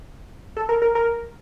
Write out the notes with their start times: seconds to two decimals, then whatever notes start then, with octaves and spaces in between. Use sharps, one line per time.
0.57 A4
0.69 A#4
0.82 A#4
0.95 A#4